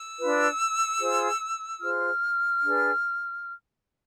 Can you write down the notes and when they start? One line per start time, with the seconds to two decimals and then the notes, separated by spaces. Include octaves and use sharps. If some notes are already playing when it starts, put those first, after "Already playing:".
Already playing: E6
0.18 D4 F4 B4
0.99 F4 G#4 C5
1.81 F4 G#4 C5 F6
2.63 D4 G#4 B4